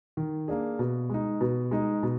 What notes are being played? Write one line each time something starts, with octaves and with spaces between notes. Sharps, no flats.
D#3
A#3 D4 G#4
B2
G#3 D#4
B2
G#3 D#4
B2